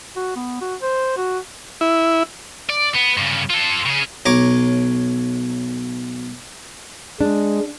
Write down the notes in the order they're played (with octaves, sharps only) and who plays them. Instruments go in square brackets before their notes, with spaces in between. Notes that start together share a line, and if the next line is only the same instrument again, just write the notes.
[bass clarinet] F#4
B3
F#4
C5
F#4
[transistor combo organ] E4
[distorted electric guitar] D5
B3
G2 C#3
F4 A4
C#3 G#4
[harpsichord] B1 C#5 A#5 D6
[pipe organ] G#3 [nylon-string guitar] D4